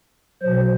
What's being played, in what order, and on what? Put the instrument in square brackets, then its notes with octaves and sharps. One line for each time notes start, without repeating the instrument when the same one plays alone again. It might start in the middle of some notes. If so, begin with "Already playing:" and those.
[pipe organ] B2 F#3 C5